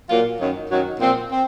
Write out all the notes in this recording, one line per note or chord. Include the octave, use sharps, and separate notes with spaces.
A#2 F#3 A#3 F4
F#2 D#3 F#3
F#2 D#3 F#3
A#2 F3 C4
C4